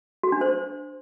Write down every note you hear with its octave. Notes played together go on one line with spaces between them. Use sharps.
F#4
D4
C5